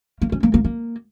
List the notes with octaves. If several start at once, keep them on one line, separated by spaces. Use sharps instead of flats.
A#3
C#4
A#3
A#3
A#3